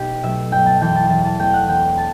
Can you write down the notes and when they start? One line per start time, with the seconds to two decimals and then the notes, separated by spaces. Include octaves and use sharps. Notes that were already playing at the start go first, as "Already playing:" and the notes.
Already playing: B1 G4
0.23 B2 F#3 A3 E5
0.52 G1 G5
0.66 A5
0.81 F#2 E3 G5
0.95 A5
1.09 E2 A5
1.25 A5
1.39 B2 A3 G5
1.54 F#5
1.68 E1 G5
1.97 A5